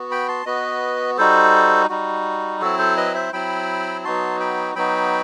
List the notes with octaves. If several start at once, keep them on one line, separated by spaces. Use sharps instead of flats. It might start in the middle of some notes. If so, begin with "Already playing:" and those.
Already playing: B3 F#4
G5 B5
A5 C6
B3 F#4 B4 D#5
G3 D#4 F#4 A4 C5
G3 D#4 F#4
F#3 C4 E4 F#4 A4
A4 C5
B4 D#5
C5 E5
F#3 C4 E4 G5 B5
F#3 B3 D#4 F#4 A5 C6
G5 B5
F#3 B3 D#4 F#4 G5 B5